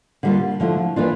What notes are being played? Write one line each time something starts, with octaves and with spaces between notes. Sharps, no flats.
D3 G3 A#3 F4
D3 F3 A3 E4
E3 A#3 D4 F4